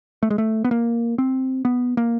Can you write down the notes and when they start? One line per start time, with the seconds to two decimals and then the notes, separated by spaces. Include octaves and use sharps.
0.23 A3
0.30 G#3
0.38 A3
0.64 B3
0.71 A#3
1.18 C4
1.65 B3
1.97 A#3